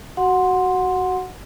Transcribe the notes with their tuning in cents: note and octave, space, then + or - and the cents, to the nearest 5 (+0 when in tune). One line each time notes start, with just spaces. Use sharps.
F#4 +15 F#5 -15 C6 +0